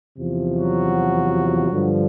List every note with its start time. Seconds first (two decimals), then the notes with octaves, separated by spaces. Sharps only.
0.18 E2 C3 F3
0.56 F#3 F#4
1.71 G2 D3 F3